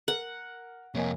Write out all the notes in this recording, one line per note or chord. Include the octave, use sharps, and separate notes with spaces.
A#4 F#5
F2 C3 A#3 C#5 D#5 G#5